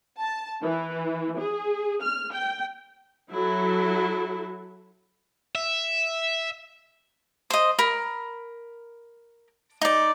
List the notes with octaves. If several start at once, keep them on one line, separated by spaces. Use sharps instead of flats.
A5
E3
G#4
F6
G5
F#3 E4 A4
E5
C5 D#5
A#4 B5
D#4 D5